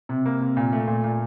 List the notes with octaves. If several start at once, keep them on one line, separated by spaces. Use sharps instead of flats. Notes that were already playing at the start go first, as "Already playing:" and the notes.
C3
A#3
C3
A#2
A3
A#2
A#2